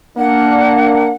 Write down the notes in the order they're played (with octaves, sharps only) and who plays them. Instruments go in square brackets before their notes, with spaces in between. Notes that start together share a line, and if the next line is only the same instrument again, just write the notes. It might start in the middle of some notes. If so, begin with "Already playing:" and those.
[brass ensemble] A#3 D4 [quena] F#5